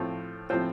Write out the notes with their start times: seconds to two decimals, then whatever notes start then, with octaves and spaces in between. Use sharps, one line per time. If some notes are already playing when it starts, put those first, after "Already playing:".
Already playing: A2 F3 C4 F4
0.50 A2 F3 C4 F4 C5